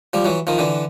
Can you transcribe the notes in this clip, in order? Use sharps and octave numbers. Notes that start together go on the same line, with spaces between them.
F3 G3
E3 F#3
D#3 F3
D3 E3